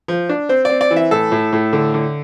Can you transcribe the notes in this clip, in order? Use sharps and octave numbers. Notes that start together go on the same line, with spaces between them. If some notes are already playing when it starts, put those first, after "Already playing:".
F3
D4
C4 C5
C4 D5
D5
E3
E5
A2 A4
A2
A2
D3
D3